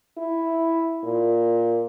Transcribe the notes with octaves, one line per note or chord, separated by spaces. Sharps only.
E4
A#2